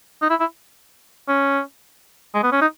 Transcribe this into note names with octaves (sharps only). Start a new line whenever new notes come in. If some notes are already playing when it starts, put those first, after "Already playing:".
D#4
E4
E4
C#4
G#3
B3
C#4
D#4